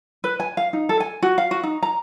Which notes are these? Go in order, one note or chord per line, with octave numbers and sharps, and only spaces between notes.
B4
G#5
F5
D#4
A4
G#5
F#4
F5
F#4
D#4
A#5